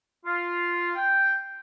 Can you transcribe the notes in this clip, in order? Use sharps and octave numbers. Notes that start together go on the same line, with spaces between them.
F4
G5